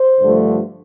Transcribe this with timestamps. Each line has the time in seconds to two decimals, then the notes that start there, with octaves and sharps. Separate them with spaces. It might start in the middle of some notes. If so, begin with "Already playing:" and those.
Already playing: C5
0.21 G2 D3 F3 A3